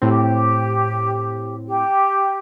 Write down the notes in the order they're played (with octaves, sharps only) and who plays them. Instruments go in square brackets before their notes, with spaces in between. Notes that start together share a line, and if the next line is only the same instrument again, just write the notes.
[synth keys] A2 C4 [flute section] G4
[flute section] G4